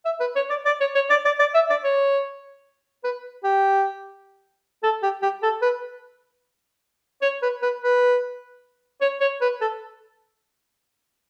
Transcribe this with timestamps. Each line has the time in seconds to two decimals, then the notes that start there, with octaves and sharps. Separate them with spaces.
0.05 E5
0.20 B4
0.36 C#5
0.50 D5
0.66 D5
0.81 C#5
0.95 C#5
1.10 D5
1.25 D5
1.39 D5
1.54 E5
1.70 D5
1.84 C#5
3.04 B4
3.44 G4
4.83 A4
5.03 G4
5.23 G4
5.43 A4
5.62 B4
7.22 C#5
7.42 B4
7.62 B4
7.82 B4
9.01 C#5
9.21 C#5
9.42 B4
9.61 A4